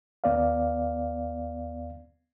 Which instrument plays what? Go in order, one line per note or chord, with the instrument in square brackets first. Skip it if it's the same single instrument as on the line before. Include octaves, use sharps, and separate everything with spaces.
[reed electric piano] D#2 B3 D5 F5